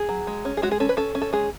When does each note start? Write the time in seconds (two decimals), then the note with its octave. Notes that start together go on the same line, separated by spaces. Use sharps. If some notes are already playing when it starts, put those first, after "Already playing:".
Already playing: G#4
0.09 F#3
0.27 G#3
0.45 C#4
0.57 G#4
0.62 G#3 F#4
0.71 G#4
0.80 C#4 A4
0.89 B4
0.97 C#4 A4
1.15 C#4
1.21 A4
1.33 G#3 G#4